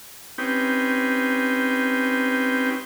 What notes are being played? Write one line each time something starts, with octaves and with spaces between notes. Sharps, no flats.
C4 C#4 D#4 G4 B4 G5